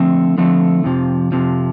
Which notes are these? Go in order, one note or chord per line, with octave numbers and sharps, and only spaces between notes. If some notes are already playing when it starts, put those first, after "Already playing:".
Already playing: D3 F3 A3 C4
D3 F3 A3 C4
F2 C3 F3
F2 C3 F3